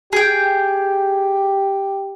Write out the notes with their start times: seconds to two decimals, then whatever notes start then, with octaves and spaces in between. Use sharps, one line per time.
0.13 G4 G#4 G5